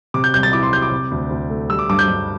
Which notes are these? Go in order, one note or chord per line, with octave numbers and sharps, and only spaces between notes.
C3 D6
G6
C2 G6
A6
E4 D6
C6
G3 G6
D6
C3
D2
D2
A3
G3 E6
D6
G2 D6
G6
G2